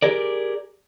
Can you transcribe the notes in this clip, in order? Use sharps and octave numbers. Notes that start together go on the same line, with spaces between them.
G4 G#4 A#4 D5